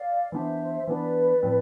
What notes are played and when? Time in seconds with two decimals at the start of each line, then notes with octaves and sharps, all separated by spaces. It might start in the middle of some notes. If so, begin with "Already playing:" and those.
Already playing: D5 F5
0.32 E3 B3 D4 C5 E5
0.87 E3 B3 D4 B4 D5
1.43 A2 F3 C4